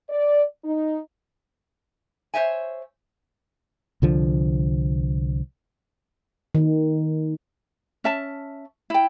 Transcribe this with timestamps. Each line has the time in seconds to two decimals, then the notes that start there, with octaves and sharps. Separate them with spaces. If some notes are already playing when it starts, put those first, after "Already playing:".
0.10 D5
0.65 D#4
2.34 C5 C#5 E5 G#5
4.02 C2 D3 F3
6.55 D#3
8.04 C#4 E5 A5
8.90 E4 G5